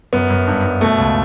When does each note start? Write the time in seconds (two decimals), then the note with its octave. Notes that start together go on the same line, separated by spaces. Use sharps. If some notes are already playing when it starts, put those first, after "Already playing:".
0.13 F#2 B3
0.30 F#2
0.47 G2
0.64 G2
0.81 B2 A3
0.98 C#2